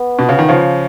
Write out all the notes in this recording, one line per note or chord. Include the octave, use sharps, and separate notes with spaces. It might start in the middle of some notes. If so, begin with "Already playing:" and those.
Already playing: B3
B2
C#3
D#3
C#3 F3